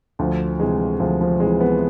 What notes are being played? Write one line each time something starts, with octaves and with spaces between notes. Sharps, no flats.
D2 F3
C3 E3 G#3
D2 F3
F3
C3 E3 G#3
B3